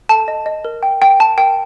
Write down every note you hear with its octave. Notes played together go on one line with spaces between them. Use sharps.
A4 A5
D#5
D#5
A#4
G5
A#4 G5
G5 A5
A#4 G5